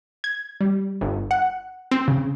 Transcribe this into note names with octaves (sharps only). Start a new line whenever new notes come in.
G#6
G3
G1
F#5
C4
C#3